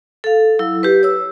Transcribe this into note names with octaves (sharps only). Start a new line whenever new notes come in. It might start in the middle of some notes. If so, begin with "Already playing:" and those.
A4 F5
F#3 E4 E6
G4 B4
C#5 E6